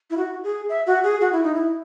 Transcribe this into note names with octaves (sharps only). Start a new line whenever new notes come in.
E4
F#4
G#4
E5
F#4
G#4
F#4
E4
D#4
E4